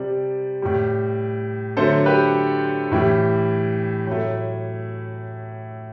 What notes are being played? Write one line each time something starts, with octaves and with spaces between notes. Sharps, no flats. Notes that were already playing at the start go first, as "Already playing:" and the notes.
Already playing: C3 G3 D5
A2 G3
D3 F#3 A3 A4 C5
G4 B4
A2 E3 G3 E4
A2 F#3 A3